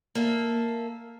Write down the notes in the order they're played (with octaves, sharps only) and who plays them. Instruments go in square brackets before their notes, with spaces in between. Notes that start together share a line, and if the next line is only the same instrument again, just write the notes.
[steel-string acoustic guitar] A#3 A4 E5